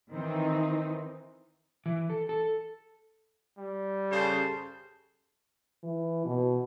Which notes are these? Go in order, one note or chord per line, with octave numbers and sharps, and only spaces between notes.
D#3 E3 C4 D#4
E3
A4
A4
G3
C#3 G4 A4 C5 A5
E3
B2